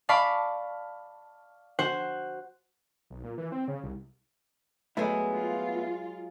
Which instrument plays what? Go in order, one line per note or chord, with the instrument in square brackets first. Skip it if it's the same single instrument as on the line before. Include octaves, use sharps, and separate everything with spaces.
[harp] D5 F5 A5 B5 C#6
F#4 C5 F#5
[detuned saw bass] B1
A#2
E3
C4
C#3
C2
[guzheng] F#3 G#3 [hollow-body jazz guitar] A3 B3 E4
[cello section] F4